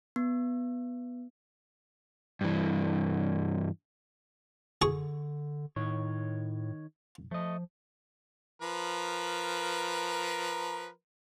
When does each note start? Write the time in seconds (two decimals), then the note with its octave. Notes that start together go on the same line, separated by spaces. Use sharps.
0.16 B3
2.41 G2 E3
4.82 D3 G#4 C#6
5.76 A2 D#3 C#5
7.31 F3 A3 D#5
8.62 F3 A#4 B4